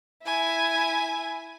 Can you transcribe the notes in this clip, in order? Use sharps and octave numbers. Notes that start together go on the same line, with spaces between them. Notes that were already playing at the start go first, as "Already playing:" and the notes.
E4 G#5